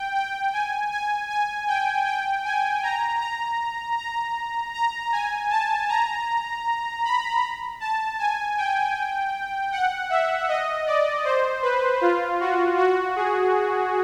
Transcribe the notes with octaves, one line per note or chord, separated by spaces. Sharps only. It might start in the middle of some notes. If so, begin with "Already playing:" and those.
Already playing: G5
G5
G#5
G#5
G#5
G5
G5
G#5
A#5
A#5
A#5
A#5
G#5
A5
A#5
B5
A5
G#5
G5
F#5
E5
D#5
D5
C5
B4
F4
F#4
F#4
G#4